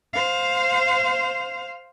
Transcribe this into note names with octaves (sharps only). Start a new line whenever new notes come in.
C5 F5